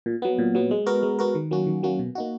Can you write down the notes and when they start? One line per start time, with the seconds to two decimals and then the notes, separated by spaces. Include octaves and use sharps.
0.06 A#2
0.22 F#3 B3
0.39 A#2
0.55 F#3 B3
0.71 G#3
0.86 B3 F#4 A#4
1.03 G#3
1.19 B3 F#4 A#4
1.35 D#3
1.51 F#3 A#3 C#4 F#4
1.67 D#3
1.83 F#3 A#3 C#4 F#4
1.99 B2
2.15 A#3 D#4 F#4